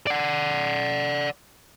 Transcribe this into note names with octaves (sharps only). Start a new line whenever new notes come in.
D5 F#5